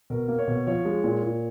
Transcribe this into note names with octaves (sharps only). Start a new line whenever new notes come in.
B2 A#4
A#3
C#5
B2
F3 C#5
G#3
A#2
A#2